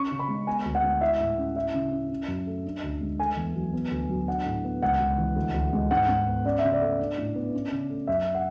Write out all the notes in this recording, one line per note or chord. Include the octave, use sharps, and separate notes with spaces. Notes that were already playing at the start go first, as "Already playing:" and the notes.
Already playing: C#4 C#6
C#3
B5
G#3
B3 G#5
D2
F#5
G#3
E4 E5
A2
C#4
E4 E5
C#3
C#4
C#4
F#2
A3
D4
D2
G#3
A3 G#5
E2
F#3
B3
D2
F#3
D4 F#5
A2
B3
C#2 F#5
C#2
E3
D2
D2
G#3
G#2 F#5
G#2
B3
C#4 D5
E5
C#3
D5
A3
D4
A2
B3
C#4
C#3
A3
F#2 E5
F#5